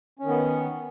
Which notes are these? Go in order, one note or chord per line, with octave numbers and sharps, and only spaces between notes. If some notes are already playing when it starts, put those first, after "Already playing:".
D#3 B3 C#4